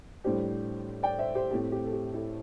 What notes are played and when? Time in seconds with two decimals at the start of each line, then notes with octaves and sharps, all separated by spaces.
0.24 A2 G3 D4 G4 C5
1.03 D5 G5
1.19 C5 E5
1.35 G4 C5
1.51 A2 A3 C4 G4
1.72 G4
1.85 A4
1.93 G4
2.14 E4 A4